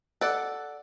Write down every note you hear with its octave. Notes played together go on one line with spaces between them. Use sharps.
A4 D5 F#5